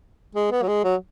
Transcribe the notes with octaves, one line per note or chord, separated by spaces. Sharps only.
G#3
B3
F#3
G#3
F#3